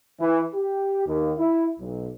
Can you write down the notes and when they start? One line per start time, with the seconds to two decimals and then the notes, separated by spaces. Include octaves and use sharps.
0.20 E3
0.54 G4
1.06 D#2
1.38 E4
1.80 B1